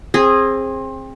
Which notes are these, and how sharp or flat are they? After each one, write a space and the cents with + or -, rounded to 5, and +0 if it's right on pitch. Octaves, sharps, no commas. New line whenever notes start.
C4 +25 G#4 -10